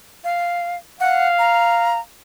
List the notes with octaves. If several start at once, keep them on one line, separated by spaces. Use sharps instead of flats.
F5
F5 F#5
A#5